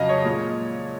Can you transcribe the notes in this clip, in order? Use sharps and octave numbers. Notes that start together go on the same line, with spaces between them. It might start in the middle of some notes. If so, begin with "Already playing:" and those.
Already playing: F2 C#3 F#3 D#5 F5
C#5
A#2 G#3